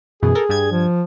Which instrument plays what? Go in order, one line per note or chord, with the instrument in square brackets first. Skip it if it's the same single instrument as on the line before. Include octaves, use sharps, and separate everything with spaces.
[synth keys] F#2 B2 E3 [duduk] G#4
[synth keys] A4 A#4
G2 G3 G#6
[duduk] F3